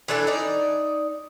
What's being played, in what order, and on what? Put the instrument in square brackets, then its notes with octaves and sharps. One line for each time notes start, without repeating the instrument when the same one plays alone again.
[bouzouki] E3 D4 A4
D#4 D5